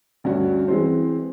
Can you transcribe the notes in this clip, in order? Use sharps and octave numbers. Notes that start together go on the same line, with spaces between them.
D2 G2 C#4 F#4
E3 G#3 C4 C5